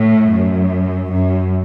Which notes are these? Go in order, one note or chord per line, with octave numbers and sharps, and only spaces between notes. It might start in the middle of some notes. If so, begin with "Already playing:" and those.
Already playing: A2
F#2
F#2